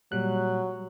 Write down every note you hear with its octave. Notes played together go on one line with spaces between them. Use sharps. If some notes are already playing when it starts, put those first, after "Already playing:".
A#2 F#3 G3 F#6